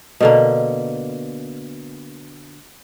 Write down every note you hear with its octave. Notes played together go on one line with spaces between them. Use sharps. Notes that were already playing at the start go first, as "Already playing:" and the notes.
B2 D3 A#3